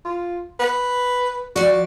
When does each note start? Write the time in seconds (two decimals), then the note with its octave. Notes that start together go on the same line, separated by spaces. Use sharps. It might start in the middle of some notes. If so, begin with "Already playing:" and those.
0.05 F4
0.60 B4
1.56 F3 F#4 D5